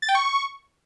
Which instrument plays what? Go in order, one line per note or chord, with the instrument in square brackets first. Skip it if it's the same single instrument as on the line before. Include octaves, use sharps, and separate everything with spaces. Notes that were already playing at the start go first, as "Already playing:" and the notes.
[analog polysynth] A6
G5
C#6